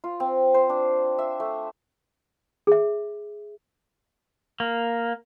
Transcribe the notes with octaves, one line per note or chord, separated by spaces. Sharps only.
F4
C4
C5
D4
E5
A3
G#4 E5
A#3